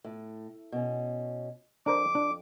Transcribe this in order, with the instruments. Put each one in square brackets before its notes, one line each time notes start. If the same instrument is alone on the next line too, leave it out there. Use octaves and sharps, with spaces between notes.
[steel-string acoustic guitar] A2
B2 C#4
[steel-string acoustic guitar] F2 [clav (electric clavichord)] D4 A#4 C5 [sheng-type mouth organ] D6
[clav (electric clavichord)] D4